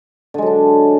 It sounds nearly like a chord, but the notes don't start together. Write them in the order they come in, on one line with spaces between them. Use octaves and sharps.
D3 G#3 F#3 D4